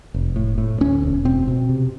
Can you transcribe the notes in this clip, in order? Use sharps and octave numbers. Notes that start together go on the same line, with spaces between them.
F1
A2
A2
D2 C#4
E1
B2 C4
B2
C3